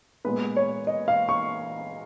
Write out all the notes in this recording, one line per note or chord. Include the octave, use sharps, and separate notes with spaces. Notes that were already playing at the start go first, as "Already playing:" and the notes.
A#2 G#3 B3 B4
C#5
D#5
F5
C#6